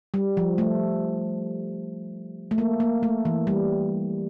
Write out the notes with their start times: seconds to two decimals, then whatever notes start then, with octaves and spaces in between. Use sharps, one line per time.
0.14 G3
0.37 F3
0.58 A3
2.51 A3
2.58 A#3
2.80 A#3
3.03 A3
3.25 E3
3.47 G3